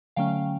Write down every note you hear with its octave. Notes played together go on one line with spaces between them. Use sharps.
D3 F#3 A3 C#4 F5 G5